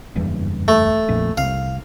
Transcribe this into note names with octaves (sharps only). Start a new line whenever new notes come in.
F#1 E2 G2
A3
A#1 F2 A#2
C2 F5